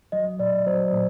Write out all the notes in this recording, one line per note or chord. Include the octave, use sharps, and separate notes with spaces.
F#3 D#5
A#2 D5
F#3 C5
A#2